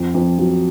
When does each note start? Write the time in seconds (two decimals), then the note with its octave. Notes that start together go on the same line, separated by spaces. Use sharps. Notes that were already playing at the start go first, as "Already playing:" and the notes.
Already playing: F2
0.14 F2
0.38 F#3